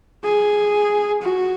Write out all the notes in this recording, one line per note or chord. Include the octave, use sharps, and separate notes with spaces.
G#4
F#4